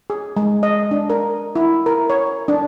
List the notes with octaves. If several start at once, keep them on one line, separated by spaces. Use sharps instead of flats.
G#4
G#3
D#5
D4
A#4
E4
A#4
C#5
D4